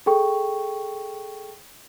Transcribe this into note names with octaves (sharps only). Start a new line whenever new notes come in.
G#4 A4 G5 C#6